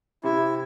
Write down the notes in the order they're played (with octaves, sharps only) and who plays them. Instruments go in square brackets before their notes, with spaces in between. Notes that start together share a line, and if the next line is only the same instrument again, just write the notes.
[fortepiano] C3 [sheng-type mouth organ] E4